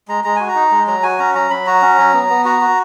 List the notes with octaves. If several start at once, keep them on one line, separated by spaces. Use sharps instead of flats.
G#3 A#5
G#3 A#5
F#4 G#5
A#5
D#4
G#3
F#3 A#5
F#4 G#5
C#4 A#5
F#3 A#5
F#3 B5
F#4 A#5
C#4
F#3
B3
B3
F#4 A#5
F#4